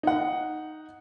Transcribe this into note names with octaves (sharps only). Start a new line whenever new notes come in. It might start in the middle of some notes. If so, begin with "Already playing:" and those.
D#4 F#5